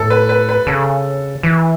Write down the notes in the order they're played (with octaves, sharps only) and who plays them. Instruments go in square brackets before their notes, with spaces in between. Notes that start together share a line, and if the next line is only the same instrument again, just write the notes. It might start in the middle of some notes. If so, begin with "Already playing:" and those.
Already playing: [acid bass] A2 [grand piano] A4
[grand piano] B4
B4
B4
[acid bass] C#3 [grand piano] A4
[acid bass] E3